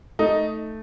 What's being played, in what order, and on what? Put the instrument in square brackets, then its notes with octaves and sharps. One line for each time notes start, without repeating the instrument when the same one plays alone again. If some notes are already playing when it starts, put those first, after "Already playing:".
[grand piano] A3 D#4